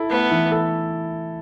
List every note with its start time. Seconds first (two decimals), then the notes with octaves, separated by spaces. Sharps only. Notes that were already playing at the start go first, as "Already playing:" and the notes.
Already playing: E4 A4
0.10 A3 B3
0.31 E3
0.52 A4